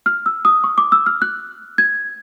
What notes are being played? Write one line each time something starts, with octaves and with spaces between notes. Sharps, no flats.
F6
E6
D#6
C#6
D6
E6
F6
F#6
G#6